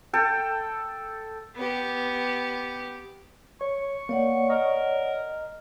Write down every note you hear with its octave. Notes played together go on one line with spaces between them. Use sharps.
A4 G5
B3 G4
C#5 C#6
A#3 C#5 D5 F#5
A#4 D#5